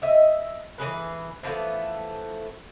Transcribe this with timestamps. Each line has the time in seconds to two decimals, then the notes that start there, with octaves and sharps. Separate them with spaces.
0.02 D#5 E5
0.78 E3 G#3 G#4 B4
1.43 E3 F3 A3 B3